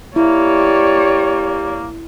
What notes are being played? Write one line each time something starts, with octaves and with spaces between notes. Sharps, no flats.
A#3 E4 G4 C#5 D5